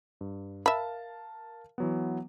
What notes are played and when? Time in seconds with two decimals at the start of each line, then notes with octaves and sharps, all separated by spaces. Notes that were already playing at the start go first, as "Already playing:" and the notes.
0.21 G2
0.66 A#4 E5 F5 A5 B5
1.78 E3 F#3 B3